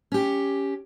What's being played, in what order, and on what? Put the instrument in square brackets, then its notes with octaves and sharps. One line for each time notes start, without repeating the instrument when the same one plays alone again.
[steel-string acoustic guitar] C#4 G4